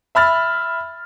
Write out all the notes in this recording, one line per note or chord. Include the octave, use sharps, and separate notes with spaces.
E5 B5 F6 A6